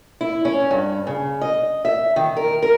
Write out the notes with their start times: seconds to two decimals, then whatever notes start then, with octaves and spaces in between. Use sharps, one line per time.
0.21 E4
0.45 C#4
0.71 G2
1.07 C#3
1.41 D#5
1.85 E5
2.16 D#3
2.37 A#4
2.62 A#4